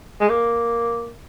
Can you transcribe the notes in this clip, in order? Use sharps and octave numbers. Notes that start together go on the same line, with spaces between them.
G#3
A#3